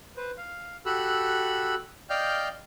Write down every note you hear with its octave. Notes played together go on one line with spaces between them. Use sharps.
B4 C5
F5
F#4 G4 A4 B5 E6 F#6
D5 D#5 F5 G5 F6 G6